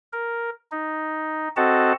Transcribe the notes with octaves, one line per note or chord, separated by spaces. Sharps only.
A#4
D#4
C4 F#4 A4 D#5 F#5 A5